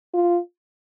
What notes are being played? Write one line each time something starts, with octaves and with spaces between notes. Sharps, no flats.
F4